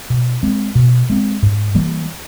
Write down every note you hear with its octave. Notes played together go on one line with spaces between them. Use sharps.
B2
G#3 C4
B2
G#3 C4
G#2
E3 G3 A#3